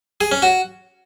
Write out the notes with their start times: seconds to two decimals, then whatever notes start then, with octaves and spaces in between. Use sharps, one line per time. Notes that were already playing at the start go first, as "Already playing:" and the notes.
0.21 G#4
0.32 C#4
0.42 F#4